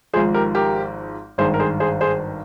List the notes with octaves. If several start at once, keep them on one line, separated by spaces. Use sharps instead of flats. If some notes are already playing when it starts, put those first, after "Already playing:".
G#1 G#2 F3 G#4 C5
G4 A#4
G4 A#4
G#1 G2 D#3 G#4 C5
A#4
G#4 C5
G#4 C5
G#4 C5